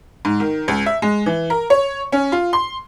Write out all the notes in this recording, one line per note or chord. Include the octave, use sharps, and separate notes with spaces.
G#2
D#3
C#2
E5
G#3
E3
A#4
C#5
C#4
F4
C6